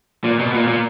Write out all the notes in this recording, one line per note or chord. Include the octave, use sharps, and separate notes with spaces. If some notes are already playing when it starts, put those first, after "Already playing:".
A#2
B2
A#2
A#2